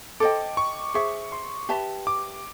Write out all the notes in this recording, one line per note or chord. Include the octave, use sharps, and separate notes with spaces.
A4 C5 D#5 G5 D6
C#6
G#4 C5 E5 C#6
C6
G4 B4 E5 A5
D6